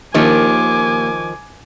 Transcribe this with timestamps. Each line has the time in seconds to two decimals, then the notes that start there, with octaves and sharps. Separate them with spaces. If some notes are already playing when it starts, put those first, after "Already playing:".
0.15 D#2 D#3 F3 G#5 D6